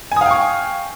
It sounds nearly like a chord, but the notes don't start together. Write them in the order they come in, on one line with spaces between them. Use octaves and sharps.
G#5 D#6 F5 G5 C#6